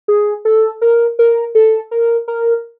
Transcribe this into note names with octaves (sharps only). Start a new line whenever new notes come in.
G#4
A4
A#4
A#4
A4
A#4
A#4